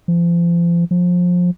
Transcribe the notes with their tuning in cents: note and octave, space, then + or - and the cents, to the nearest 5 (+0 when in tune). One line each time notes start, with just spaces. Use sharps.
F3 -35
F3 +25